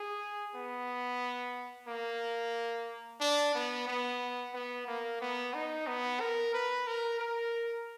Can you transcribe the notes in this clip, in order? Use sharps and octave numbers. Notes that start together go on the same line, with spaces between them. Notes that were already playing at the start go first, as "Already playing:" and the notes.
Already playing: G#4
B3
A#3
D4
B3
B3
B3
A#3
B3
D#4
B3
A#4
B4
A#4
A#4